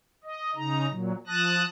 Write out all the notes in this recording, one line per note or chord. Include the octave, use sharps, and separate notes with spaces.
D#5
C#3 D#4 A#5
A#2 F#3
F3 A5 D#6 F#6 A#6